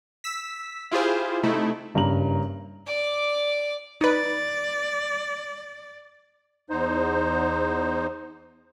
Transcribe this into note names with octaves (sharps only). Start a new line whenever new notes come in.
E6 B6
E4 F4 G4 G#4 C5
C3 A3 D#4 E4
F#1 G2 C#4 A#5 F#7
D5 D6
D#4 B4 D5
E2 D#4 C5